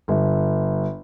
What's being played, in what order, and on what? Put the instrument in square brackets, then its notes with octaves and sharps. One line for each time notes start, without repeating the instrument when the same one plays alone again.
[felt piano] G1